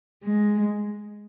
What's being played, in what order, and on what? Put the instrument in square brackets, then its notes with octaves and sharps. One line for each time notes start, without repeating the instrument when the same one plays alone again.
[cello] G#3